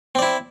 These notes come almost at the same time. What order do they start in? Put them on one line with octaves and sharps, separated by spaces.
C4 D5 E4